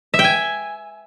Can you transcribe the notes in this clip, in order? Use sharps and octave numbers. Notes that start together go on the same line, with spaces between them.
E5
G5
G#5